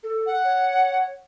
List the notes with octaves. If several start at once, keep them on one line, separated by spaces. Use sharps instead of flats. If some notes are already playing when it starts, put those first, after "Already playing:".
A4
F#5
C#5